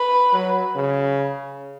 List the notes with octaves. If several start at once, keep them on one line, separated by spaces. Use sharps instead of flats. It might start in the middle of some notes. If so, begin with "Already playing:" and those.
Already playing: B4
F#3
C#3